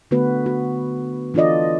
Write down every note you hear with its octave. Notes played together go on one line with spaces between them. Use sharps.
D3 A3 B3 F#4 B4
F#4
E3 D4 F4 A4 D5 D#5